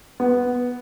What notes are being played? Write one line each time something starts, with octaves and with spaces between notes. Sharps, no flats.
B3